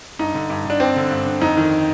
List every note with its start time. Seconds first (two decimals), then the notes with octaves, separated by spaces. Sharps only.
0.19 G2 D#4
0.35 D3
0.50 G2
0.65 D3 D4
0.80 G2 C4
0.96 D3
1.11 G2
1.26 D3
1.41 F2 D#4
1.57 D#3